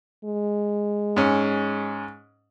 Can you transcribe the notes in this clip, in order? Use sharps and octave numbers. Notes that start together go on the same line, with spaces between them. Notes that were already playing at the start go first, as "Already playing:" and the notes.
G#3
G#2 C#4